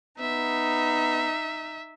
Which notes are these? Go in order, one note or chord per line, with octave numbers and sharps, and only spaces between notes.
B3 D#4 E5